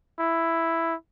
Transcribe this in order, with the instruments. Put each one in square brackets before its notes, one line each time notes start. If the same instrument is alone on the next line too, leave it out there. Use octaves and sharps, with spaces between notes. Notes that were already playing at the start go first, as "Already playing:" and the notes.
[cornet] E4